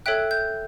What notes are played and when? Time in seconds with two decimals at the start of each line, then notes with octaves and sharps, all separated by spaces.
0.06 A4 C#5 E5 G5 F#6
0.31 G6